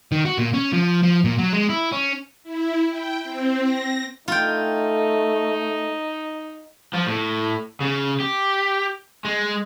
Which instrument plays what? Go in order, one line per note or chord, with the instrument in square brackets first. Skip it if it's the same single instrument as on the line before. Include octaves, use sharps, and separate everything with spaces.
[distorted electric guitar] D#3
F#4
A#2
C#4
F3
F3
A#2
F#3
G#3
E4
C#4
[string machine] E4
G5
C4
A#6
[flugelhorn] A3 [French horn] D#4 [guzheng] F4 G5
[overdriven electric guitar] F3
A2
C#3
G4
G#3